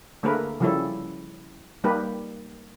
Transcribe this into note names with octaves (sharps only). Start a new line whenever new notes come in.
D3 A3 A#3 G#4 A#4 B4
C#3 F3 G3 C#4 E4 A4
G3 A#3 D#4 G4 B4